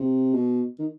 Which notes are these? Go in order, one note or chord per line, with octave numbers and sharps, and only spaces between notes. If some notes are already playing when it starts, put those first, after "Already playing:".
Already playing: C3
B2
D#3